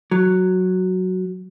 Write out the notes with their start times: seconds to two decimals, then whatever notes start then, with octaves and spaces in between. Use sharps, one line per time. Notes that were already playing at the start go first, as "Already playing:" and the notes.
0.11 F#3